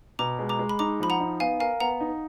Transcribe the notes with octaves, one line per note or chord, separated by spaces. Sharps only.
B2 A#5 D6
G#3
A#5 D6
G#3
B5
D#4 A#5 D6
F3 B5
F#5 A#5
D#4
B3 F5 G#5
A#4 F5 G#5
B3 F#5 A#5
D#4